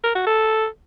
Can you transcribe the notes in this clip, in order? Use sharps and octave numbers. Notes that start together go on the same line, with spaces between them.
A#4
F#4
A4